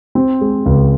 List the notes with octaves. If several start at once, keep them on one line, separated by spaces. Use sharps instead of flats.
C4
G#3
C#2